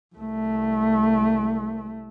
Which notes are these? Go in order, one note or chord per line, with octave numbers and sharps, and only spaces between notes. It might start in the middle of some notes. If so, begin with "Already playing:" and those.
C2 A3